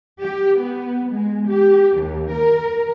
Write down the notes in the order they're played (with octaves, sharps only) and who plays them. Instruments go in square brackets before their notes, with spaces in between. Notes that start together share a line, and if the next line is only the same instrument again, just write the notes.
[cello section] G4
B3
G#3
G4
D#2
A#4